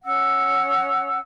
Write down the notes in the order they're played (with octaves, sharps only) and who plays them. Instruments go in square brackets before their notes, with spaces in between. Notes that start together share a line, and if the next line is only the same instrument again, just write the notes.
[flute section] C#4 F#5 E6